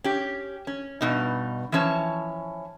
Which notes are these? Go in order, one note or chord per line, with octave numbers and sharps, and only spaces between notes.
C#4 G4
C#4
G2 B2 D#4
E3 F3 C#4 C#5 A5